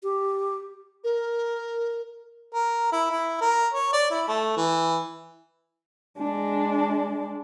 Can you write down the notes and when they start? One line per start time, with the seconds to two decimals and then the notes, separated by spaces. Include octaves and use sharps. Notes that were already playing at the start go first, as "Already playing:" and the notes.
0.03 G4
1.04 A#4
2.54 A#4
2.92 E4
3.10 E4
3.41 A#4
3.74 C#5
3.93 D5
4.11 E4
4.28 A3
4.57 E3
6.18 G#3 D4